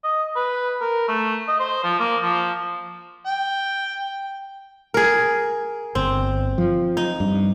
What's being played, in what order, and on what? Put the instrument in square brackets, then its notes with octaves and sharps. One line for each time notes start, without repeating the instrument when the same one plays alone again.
[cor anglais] D#5
B4
A#4
A3
D#5
C5
F3
A#3
F3
[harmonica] G5
[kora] G#4 A#4
[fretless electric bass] G1 [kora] C4
[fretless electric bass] F3
[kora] D#4
[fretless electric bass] G2